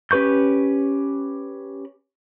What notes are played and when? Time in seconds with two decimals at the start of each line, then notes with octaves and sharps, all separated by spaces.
0.11 C#4 G4 B4 C#6 G6